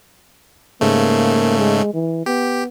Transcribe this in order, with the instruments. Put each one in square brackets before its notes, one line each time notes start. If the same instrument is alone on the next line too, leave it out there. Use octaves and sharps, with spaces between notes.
[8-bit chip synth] G#2 C#3 A3 [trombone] A#3
[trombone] G#3
E3
[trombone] B3 [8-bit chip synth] G4